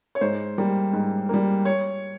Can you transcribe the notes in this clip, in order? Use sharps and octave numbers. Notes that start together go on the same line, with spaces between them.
C#5
G#2 C5
G3 A#3
G#2
G3 A#3
C#5